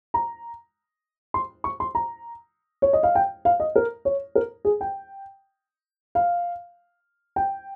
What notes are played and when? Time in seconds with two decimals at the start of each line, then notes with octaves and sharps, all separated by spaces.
0.14 A#5
1.34 C6
1.64 C#6
1.80 C6
1.95 A#5
2.82 C#5
2.93 D#5
3.03 F5
3.15 G5
3.45 F5
3.60 D#5
3.76 A#4
4.05 C#5
4.35 A#4
4.65 G#4
4.81 G5
6.15 F5
7.36 G5